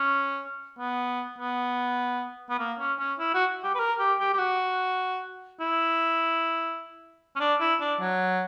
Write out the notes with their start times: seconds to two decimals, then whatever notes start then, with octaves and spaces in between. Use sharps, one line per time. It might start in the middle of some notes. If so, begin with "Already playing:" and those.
Already playing: C#4
0.79 B3
1.39 B3
2.50 B3
2.59 A#3
2.79 C#4
2.99 C#4
3.19 E4
3.34 F#4
3.63 G4
3.75 B4
3.79 A#4
3.99 G4
4.19 G4
4.33 G4
4.39 F#4
5.60 E4
7.36 C#4
7.40 D4
7.60 E4
7.81 D4
8.00 F#3